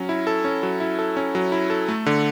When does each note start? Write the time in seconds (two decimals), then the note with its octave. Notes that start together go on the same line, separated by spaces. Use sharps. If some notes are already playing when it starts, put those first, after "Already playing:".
Already playing: F#3 C#4
0.09 E4
0.27 A4
0.44 C#4
0.63 F#3
0.80 E4
0.99 A4
1.17 C#4
1.35 F#3
1.52 E4
1.70 A4
1.89 A3
2.06 D3